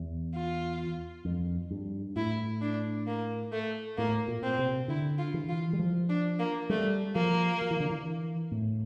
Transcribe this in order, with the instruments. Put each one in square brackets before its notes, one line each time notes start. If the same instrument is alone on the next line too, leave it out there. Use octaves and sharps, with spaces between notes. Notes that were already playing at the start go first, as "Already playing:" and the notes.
Already playing: [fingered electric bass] E2
[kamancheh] F4
[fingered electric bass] F2
G2
[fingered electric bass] A2 [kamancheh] E4
[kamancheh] D4
A#3
A3
[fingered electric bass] A2 [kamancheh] A#3
[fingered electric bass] A#2
[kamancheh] C4
[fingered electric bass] C3
[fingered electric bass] D3 [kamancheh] E4
[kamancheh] F4
[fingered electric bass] E3
[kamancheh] F4
[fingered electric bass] G3
F3
[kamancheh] D4
A#3
[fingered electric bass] G3 [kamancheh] A3
[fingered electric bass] F3 [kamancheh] A#3
[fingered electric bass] F3
E3
D3
E3
A2